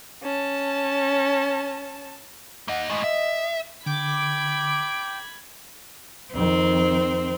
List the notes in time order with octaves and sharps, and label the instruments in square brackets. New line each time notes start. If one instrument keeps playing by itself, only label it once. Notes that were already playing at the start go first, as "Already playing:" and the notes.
[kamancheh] C#4 A5
[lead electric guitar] A#3 D#5 [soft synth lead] F#5
[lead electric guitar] A2 G#3 [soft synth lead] D#5
[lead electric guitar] E5
[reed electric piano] D3 [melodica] G5 [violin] B5 G#6 [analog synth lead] D6
[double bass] F2 D#3 [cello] C4